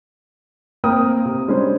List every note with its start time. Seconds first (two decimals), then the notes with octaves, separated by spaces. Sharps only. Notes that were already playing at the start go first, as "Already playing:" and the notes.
0.84 A#3 C4 A#4 G5 D#6
1.25 C3
1.48 G3 G#3 C#4 D4 C5